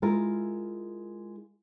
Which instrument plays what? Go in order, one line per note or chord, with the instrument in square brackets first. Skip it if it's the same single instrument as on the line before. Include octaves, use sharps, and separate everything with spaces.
[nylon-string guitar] G#3 E4 F4 A#4